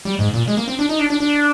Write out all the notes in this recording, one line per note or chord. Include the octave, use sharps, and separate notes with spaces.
G3
G#2
A#2
G#3
A#3
C4
D4
D#4
D4
D4
D4